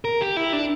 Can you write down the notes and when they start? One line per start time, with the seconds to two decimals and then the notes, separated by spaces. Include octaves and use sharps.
0.05 A#4
0.21 G4
0.37 E4
0.53 D4